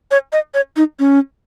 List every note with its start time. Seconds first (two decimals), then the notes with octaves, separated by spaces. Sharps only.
0.11 C#5
0.33 D#5
0.54 C#5
0.77 D#4
0.99 C#4